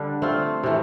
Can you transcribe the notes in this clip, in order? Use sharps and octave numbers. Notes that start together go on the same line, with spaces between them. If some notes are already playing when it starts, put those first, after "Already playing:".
Already playing: D3 G3 D4
A3 C4 F4
C3 E3 A3